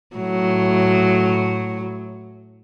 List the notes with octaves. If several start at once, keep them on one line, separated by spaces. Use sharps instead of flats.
A2 F#3